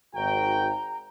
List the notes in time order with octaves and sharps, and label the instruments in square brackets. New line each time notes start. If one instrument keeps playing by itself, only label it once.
[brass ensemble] G#1 F#4 G5 [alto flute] A#5